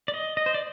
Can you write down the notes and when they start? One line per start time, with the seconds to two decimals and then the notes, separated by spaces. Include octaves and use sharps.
0.08 D5
0.14 D#5
0.37 D#5
0.46 C5
0.54 D5